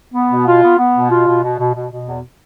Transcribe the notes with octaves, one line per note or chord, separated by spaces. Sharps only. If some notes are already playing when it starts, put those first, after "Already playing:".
B3
B2
F4
B3
B3
B2
F4
B2
B2
B2
B2
B2
E2